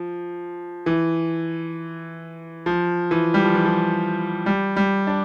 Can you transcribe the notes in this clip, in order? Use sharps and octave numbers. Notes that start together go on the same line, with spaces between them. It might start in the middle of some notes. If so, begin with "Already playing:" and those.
Already playing: F3
E3
F3
E3
G3
F3
E3
F3
G3
G3
D4